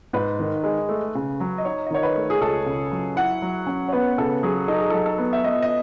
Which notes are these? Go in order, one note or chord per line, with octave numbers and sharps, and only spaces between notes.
G#2 B4
D#3
G#3
A3
C#3
F#3
D#5
D#4 C#5
D#5
D#3 C#5
B4
A3
G#4
C#2 A4
C#3
F#3
E4 F#5
F#3
C#4
C#5
B3 B4
C#3 A4
F#3 G#4
D#4 A4
G#4
A4
F#3
A4
B3
E5
B3 D#5
D#5